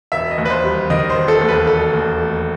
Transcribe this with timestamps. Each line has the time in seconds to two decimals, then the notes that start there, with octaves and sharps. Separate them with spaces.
0.12 E1 E5
0.31 D#5
0.38 D#2
0.45 B4
0.50 C5
0.64 G3
0.90 D#3 D#5
1.10 C5
1.16 E1
1.28 A4
1.41 D#2
1.48 B4
1.67 E1 A4
1.93 D#2
2.20 A3